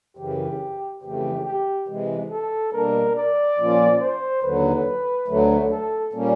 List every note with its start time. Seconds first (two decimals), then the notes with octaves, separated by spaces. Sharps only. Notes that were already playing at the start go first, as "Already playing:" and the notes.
0.17 F#2 C#3 E3 G4
1.02 F2 C#3 E3 A3 G4
1.45 G4
1.88 C3 E3 G#3
2.30 A4
2.73 B2 G3 A#3 D4 A#4
3.15 D5
3.57 A#2 F3 A#3 C#4 F4
4.00 C5
4.43 D#2 D3 F#3 B4
5.28 D2 D3 F#3 A3
5.71 A4
6.13 A#2 G3 A#3 C#4